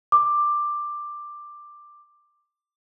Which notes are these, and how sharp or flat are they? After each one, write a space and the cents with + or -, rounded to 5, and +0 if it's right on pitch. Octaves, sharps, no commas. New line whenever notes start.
D6 +10